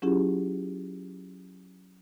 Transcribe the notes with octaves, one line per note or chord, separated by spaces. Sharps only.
F#3 C#4 E4 F4 G4 G#4